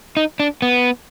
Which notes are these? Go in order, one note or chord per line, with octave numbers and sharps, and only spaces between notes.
D#4
D4
B3